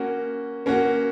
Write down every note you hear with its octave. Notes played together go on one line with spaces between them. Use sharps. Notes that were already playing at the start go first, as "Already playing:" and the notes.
Already playing: A#3 C#4 F#4
A#3 C#4 F#4